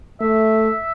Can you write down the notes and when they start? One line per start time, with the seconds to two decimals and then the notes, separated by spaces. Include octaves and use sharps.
0.21 A3 E5